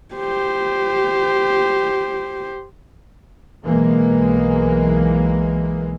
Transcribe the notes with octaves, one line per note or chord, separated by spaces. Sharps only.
G4 C5
B1 E3 G#3 A#3